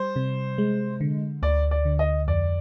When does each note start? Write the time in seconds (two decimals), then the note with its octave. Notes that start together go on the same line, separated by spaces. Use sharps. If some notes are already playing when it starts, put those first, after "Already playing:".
Already playing: G3 C5
0.16 C3
0.58 G#3
1.01 D3
1.42 D2 D5
1.71 D5
1.85 D3
1.99 D#5
2.28 F2 D5